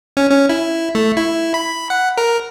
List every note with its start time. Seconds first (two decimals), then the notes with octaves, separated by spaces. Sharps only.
0.17 C#4
0.30 C#4
0.49 E4
0.95 A3
1.17 E4
1.54 B5
1.90 F#5
2.18 A#4